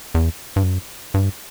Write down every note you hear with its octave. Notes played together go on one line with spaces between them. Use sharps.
E2
G2
F#2
G2